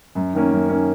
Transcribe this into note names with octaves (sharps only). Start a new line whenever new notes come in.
F#2
D#3 A#3 C#4
F#2
D#3 A#3 C#4